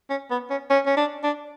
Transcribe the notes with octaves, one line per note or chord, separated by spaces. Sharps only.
C#4
B3
C#4
C#4
C#4
D4
D4